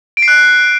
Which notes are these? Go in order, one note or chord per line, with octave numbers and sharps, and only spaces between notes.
D7
C7
F#6